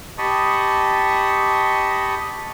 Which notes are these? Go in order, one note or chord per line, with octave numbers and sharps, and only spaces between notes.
G4 D#5 A5 B5 C#6 D#6